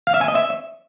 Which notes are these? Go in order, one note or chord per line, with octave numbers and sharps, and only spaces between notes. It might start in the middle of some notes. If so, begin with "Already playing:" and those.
F5
E5
G#5
D#5
E5